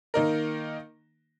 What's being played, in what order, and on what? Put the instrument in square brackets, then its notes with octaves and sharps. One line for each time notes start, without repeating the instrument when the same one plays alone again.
[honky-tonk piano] D#3 A#3 D#4 A#4